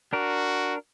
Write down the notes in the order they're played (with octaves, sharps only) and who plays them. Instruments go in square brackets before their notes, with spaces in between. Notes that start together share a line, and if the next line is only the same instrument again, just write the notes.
[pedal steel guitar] D4 A#4 [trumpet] F#4